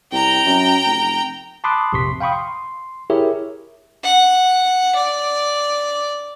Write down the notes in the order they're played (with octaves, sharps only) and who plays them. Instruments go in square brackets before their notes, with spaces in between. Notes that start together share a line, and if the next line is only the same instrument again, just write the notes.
[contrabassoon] C2 [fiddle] G5 A#5
[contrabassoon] F#2
F1
[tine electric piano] A5 B5 C6 D6 D#6 F#6
A#1 F2 C3 C6 C#6 B6
F5 G5 B5 C#6 D#6
C6
E4 G4 G#4 A#4 C#5 E5
[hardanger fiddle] F#5
D5